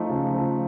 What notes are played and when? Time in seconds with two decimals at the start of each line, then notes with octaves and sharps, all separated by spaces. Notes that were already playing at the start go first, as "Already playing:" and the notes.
Already playing: F3 A3 D#4
0.09 C#3
0.34 F3